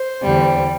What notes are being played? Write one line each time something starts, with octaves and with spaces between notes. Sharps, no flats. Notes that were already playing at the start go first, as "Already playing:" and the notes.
Already playing: C5
E2 D3 G3